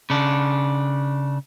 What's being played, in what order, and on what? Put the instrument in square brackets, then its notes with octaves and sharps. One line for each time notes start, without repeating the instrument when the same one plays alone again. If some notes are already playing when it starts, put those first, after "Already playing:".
[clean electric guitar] C#3 D4